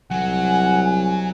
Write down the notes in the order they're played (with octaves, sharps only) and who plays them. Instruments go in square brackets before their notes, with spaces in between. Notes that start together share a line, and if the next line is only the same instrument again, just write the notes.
[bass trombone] C2 [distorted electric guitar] F#3 [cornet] F#5 [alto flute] G#5